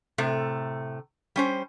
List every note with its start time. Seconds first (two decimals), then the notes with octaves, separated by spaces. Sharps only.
0.18 A2 C3 A3
1.36 G3 C#4 C5